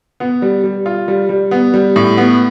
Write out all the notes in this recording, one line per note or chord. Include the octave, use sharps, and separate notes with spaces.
B3
G3
G3
F4
G3
G3
B3
G3
A2
B3